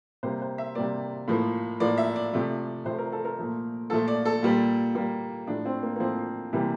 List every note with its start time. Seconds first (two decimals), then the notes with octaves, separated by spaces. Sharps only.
0.23 C3 G3 A#3 C5
0.42 C5
0.58 E5
0.75 C3 G3 A#3 D5
1.28 A2 F3 A#3
1.80 A2 F3 A#3 D5
1.98 E5
2.16 D5
2.33 C3 F3 A3
2.85 C3 F3 A3 C5
2.98 A#4
3.12 A4
3.25 A#4
3.39 A#2 F3 A3
3.90 A#2 F3 A3 A4
4.08 D5
4.25 A4
4.43 A#2 G3 A#3
4.95 A#2 G3 A#3
5.47 A2 F3 A3 D4
5.65 C4
5.83 A#3
5.96 A#3
6.00 A2 F3 A3 C4
6.53 C3 E3 G3 A#3